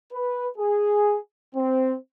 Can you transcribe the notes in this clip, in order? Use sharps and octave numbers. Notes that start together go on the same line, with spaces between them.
B4
G#4
C4